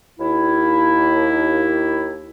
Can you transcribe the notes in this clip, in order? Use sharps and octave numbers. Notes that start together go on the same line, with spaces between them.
D#2 E4